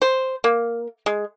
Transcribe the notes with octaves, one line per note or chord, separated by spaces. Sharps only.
C5
A#3
G#3